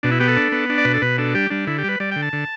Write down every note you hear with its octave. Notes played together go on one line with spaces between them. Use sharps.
B2 D4
E4
B3 G4
A4
D4
B3
D4
D5
B2 B4
A4
B2 B4
D4 A4
G3 G4
G3 D4
D3 E4
G4
G3 B4
G3 D5
D3 G5
A5
D3